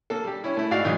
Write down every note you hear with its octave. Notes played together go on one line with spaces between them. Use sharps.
A#3 A4
G3 G4
C#4 E4
A3 E4
G#1 F#4 D5 F5
G#2 D#3 E3 F#3